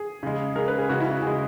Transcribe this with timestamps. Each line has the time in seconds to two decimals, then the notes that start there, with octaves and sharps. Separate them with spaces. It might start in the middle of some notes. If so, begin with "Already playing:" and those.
Already playing: G#4
0.23 C#3 G#3
0.56 C#3 G#3 A#4
0.68 B4
0.78 G#4
0.89 C#3 G#3 F#4
1.00 E4
1.11 F#4
1.22 C#3 G#3 G#4